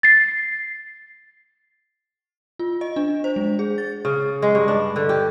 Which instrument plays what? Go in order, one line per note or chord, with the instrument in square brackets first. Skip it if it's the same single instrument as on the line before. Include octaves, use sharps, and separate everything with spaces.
[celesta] A6 C7
[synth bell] F4
D#5
D4
C5
G#3
G#4
A6
[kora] C#3
G#3
G2
D4
D3
G4